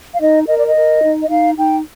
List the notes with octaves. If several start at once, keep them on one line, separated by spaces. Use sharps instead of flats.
F5
D#4 D#5
A#4 D#5
D5
D#5
A#4
D#4
D#5
D#4 F5
D#4 G5